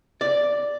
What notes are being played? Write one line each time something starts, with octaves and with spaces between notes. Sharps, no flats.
D5